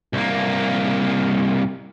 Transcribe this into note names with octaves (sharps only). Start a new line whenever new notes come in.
C2 A#3